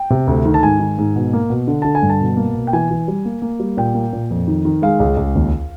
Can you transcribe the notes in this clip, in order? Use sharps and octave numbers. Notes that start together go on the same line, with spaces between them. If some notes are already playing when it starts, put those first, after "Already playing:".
Already playing: G5
C3
D2
D#3
A5
G#2 G#5
D#3
G#2
B2
A#3
B2
D3
D3 A5
G#5
G2
A5
B2
A#3
B2
G5
E3 G#5
E3
G3
A#3
A#3
G3
A#2 G5
A#3
A#2
F2
D#3
D#3
G#3 F5
C#2
C#2
D#2